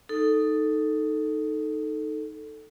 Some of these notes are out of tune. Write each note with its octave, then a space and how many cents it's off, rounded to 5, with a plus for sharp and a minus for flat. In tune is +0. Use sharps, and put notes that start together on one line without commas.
D#4 +0 A4 +0